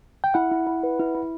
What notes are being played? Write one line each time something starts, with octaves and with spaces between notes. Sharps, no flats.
G5
E4 F#5
E4
E4
B4
E4
E4